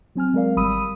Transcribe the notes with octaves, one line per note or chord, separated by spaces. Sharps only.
F#3 C4 G#5 F6
F#3 G#3 C4 A#4 D5 F5
G#1 G3 B5 D#6 E6 D#7